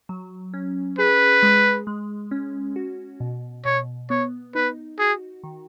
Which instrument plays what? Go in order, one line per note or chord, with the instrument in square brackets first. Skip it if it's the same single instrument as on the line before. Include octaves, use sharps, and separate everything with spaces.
[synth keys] F#3
C#4
[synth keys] G#4 [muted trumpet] B4
[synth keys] G#3
G#3
C#4
F#4
B2
[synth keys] B2 [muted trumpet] C#5
[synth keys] B3 [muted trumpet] C#5
[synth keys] D#4 [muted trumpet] B4
[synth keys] F#4 [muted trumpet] G#4
[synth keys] D#3